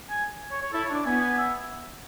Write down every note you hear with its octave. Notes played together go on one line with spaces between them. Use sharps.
G#5
C#5
C#5
E4 A4
C#5
D4
D5
B3 G#5
G#5
E5